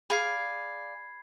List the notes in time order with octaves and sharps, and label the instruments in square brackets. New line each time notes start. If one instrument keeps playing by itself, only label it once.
[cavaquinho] G#4 D5 F5 [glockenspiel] B5 G#6 C7